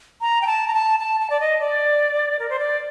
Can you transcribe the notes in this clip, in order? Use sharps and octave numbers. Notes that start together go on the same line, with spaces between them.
A#5
G5
A5
A#5
A5
A5
A5
D5
D#5
D5
A#4
C5
D5